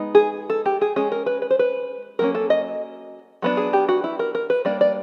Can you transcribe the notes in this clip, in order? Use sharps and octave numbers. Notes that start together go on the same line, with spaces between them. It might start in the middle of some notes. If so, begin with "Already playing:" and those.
Already playing: G#3 B3 D#4
G#4
A4
G4
G#4
G#3 C#4 G#4
A#4
B4
B4
C5
B4
F#3 A#3 C#4 A#4
A4
D#5
F#3 B3 D4
G#4
G4
F#4
E4
A#4
A#4
B4
G3 A#3 D4 D5
D5